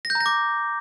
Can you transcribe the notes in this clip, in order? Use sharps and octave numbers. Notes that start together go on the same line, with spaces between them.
A#6
G6
A#5
A#6
D6